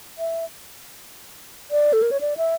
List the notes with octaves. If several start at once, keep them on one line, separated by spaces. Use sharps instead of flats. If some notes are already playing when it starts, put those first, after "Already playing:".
E5
D5
A4
A#4
C#5
D5
E5